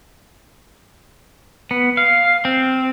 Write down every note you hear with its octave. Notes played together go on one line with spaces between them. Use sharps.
B3
F5
C4